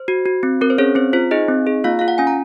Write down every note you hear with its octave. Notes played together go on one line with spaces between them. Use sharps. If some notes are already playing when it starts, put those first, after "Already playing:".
Already playing: C5
F#4
F#4
C4
C4 A#4
C5
C#4 G#4 C#5
C4 C5
F4 C5
D#4 G#4 D#5
C4
G#4
A#3 F4 F5
F4 F5
F#5
C#4 G#5
A#5